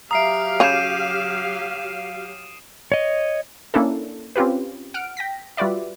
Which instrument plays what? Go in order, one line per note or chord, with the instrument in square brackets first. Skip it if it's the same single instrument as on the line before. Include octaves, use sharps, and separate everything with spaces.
[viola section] F#3 G4 F5 [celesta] E5 A#5 [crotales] D#6 C7 D7
[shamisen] C#3 C#5 [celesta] D6 G6 [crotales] D#7 E7
[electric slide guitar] C#5 D#5
[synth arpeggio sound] A#3 C#4 D4 E4 A4
C4 C#4 F4 G4 B4
F#5 F6 D7
G5 A#6 B6
G3 F4 F#4 B4 D5 E5